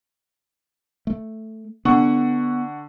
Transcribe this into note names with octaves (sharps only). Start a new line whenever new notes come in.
A3
D3 B3 F#5 C#6